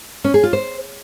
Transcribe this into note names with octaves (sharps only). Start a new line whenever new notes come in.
C#4
G#4
F4
C5